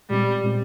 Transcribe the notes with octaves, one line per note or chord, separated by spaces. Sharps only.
A#2 G3 G#3 C4
A#2 G#3 C4